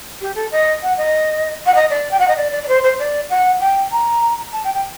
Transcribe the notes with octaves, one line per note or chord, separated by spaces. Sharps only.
G4
A4
D#5
F#5
D#5
F#5
D#5
D5
G5
F#5
D#5
D5
D5
D5
C5
C5
D5
F#5
G5
A#5
A5
G5
G5